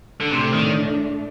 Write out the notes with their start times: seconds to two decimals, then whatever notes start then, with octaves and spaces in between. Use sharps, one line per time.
0.20 D3
0.31 A2 C3 A3 D4
0.53 D#3